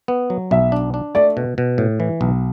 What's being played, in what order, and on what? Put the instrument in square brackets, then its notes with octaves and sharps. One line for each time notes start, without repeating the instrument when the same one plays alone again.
[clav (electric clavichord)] B3
F#3
[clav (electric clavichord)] B1 [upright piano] E5
[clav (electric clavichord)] D4
D4
[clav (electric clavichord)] A3 [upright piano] D5
[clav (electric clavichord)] B2
B2
A2
E3
B1